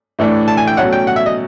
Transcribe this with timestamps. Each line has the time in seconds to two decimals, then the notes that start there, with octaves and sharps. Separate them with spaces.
0.19 A2 E3 A3 D4
0.48 A5
0.57 G#5
0.67 G5
0.77 B2 F#3 A3 C#4 F#5
0.93 G5
1.07 F#5
1.16 E5
1.26 D#5